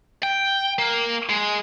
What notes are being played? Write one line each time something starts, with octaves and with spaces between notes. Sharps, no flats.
G5
A#3
G#3